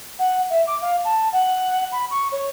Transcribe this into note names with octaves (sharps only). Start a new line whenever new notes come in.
F#5
E5
D6
F5
A5
F#5
B5
C#6
C#5